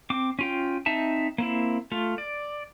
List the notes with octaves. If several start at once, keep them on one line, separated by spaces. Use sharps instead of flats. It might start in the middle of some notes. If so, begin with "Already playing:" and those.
C4 D6
C#4 F4 G5
C4 D#4 E5 A5
A#3 C4 E4
A3 F4
D5